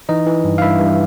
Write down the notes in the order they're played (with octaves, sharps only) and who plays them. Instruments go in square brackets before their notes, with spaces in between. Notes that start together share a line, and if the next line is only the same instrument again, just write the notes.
[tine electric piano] E3 D#4 D#5
E3
G2
F5
G2 E4 E5
G2